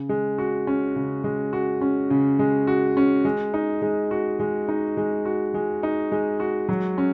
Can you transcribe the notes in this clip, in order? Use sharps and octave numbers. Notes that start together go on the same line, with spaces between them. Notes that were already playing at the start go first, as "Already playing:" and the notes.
Already playing: C#3
G#3
F#4
C#4
C#3
G#3
F#4
C#4
C#3
G#3
F#4
C#4
G#3
D#4
G#3
F#4
G#3
D#4
G#3
F#4
G#3
D#4
G#3
F#4
F#3
C#4